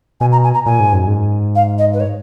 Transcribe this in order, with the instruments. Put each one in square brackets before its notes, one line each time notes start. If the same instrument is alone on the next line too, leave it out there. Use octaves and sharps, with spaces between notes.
[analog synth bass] B2 [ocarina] G#5
[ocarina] A#5
G#5
A#5
[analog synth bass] A#2 [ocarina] G#5
[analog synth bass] G#2
F#2
G#2
[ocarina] F5
D#5
B4
C#5